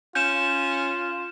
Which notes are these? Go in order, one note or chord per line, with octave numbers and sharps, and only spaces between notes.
C#4 F4 G6 E7